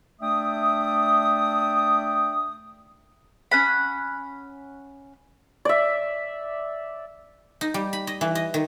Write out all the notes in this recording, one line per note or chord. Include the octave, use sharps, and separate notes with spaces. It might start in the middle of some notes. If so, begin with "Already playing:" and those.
A3 D4 D5 E5 G5 D#6
C#4 F#5 B5
D5 E5
D#4
G3
B5
D#5
E3
D#5
D#3